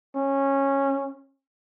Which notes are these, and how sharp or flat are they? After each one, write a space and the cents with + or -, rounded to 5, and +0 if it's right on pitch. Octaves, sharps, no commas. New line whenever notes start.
C#4 -15